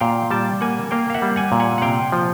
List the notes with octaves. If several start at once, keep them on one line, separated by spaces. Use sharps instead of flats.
A#2 F5 G5
G3 G5 A5
A#3 F#5 G#5
A#3 F5 G5
F5
E5 F#5
G3
F#5 G#5
A#2
F#5 G#5
F#5
C3 F5 G5
F3